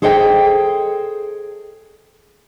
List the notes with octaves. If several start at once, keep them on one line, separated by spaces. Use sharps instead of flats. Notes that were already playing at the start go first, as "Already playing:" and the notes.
G#4 A4 C5 D#5 F#5 G5